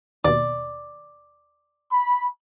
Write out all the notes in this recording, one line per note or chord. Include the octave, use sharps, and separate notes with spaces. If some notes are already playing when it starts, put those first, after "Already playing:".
D#2 B2 D5
B5